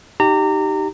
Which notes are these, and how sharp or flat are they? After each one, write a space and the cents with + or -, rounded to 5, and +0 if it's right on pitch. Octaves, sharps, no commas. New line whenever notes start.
D#4 +0 G4 -10 A#5 -30